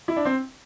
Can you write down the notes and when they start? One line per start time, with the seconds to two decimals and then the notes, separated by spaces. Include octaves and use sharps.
0.08 E4
0.16 D4
0.25 C4